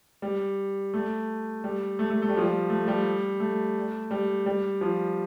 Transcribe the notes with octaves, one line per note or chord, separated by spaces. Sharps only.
G3
A3
G3
A3
A3
A3
G3
F3
G3
A3
G3
A3
G3
G3
F3